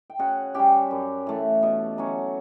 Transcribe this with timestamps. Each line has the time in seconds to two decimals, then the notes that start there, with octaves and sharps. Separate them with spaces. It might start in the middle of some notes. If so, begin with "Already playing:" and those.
0.10 G5
0.19 C#3 F#4 F#5
0.54 G3 C#4 G4 G5
0.91 F#2
1.27 E3 A3
1.63 B2
1.98 F#3 C#4